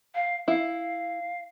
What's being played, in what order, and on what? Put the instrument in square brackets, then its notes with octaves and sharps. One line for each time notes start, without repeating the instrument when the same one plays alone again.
[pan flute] F5
[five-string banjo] E4 [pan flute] F5